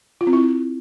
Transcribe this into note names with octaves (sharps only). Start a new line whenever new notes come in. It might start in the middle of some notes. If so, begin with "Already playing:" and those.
F4
C4
E4